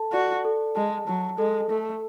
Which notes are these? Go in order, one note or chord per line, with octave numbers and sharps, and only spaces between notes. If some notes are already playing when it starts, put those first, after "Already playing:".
Already playing: A4 A5
F#4 D5
A4
G#3 A5
F#3 A5
G#3 A4
A3 A4